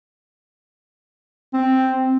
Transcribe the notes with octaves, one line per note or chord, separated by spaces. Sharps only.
C4